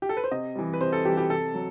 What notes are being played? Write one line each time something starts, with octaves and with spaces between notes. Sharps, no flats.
G4
A4
B4
C5
C3 D#5
E3 G3
B4
C3 C5
A4
E3 G3 G4
G4
C3 A4
F#3